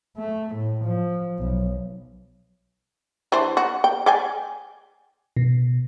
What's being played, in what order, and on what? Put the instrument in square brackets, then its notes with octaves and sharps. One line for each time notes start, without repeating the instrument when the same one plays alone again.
[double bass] A3
A2
F3
B1
[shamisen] E3 D4 C5
F#4
G5
D5 G5 G#5
[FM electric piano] B2